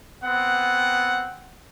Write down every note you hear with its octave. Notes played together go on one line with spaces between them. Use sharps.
B3 C4 F#5